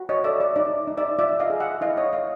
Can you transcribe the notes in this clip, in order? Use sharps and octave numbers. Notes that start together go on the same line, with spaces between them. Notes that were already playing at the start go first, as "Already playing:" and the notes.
Already playing: F#4
C#5 D#5
A4 D5 E5
D5
D#4 D5
D#4
D5 E5
F4 D5 E5
D#5 F5
G#4
E5 F#5
E4 D#5 F5
C#5 D#5
E4 D#5 F5